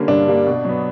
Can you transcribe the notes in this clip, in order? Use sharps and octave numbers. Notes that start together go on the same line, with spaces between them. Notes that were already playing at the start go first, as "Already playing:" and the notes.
Already playing: D3 G3 A#3 C#4
G2 D4
D3 G3 A#3
B2
F#3 B3